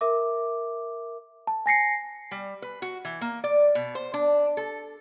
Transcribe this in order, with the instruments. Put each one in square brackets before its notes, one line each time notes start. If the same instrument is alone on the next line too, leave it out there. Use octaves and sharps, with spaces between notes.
[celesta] A#4 E5 D6
A5
G#5 A#6 C7 C#7
[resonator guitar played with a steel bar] G3
B4
F#4
E3
A#3
D5
B2
C5
D4
A4